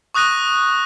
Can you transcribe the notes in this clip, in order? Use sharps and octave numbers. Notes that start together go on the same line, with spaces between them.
C#6 D#6 F#6 A#6 D#7